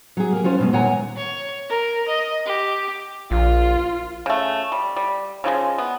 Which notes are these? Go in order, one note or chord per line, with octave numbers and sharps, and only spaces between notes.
F#3 G#4
A#3 G4
F#3 C#4 F4 C5
G2 B2 G#3
D#2 A#2 C#5 F#5 G#5 A#5
C#5
A#4
D#5
G4
A#1 F4
C#3 A3
G3
G3
C#3 F3 G3 G#3
B3